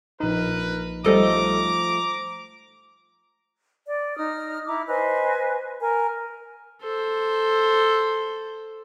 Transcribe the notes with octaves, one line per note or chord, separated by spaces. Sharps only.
A#1 D#4 A#4 B4
F3 G3 A3 A4 D#5 A#5 D6
D5
D#4 D#6 F6
E4 A#5 D6
B4 C5 D#5 G#5
A#4 G#5
A4 C5